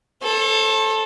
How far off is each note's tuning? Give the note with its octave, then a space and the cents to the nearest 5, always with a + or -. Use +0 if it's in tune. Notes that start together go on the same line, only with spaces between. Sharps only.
A4 +0 C5 +45